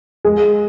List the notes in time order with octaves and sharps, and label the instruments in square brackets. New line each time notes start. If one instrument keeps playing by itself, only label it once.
[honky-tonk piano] G#3